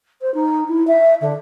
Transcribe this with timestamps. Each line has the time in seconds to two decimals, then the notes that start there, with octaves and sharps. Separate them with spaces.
0.22 C5
0.34 D#4
0.69 E4
0.87 E5
1.21 D3